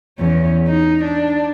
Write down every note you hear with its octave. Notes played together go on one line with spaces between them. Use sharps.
E2 C#4
D#4
D4